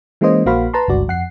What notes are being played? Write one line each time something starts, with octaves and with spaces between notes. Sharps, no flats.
E3 G#3 A#3 C#4 C5 D#5
A#1 A#3 F#4 C5 F5 B5
B4 A5 A#5 C6
G1 C#2 G2 F#4 D5
F2 F#5 C7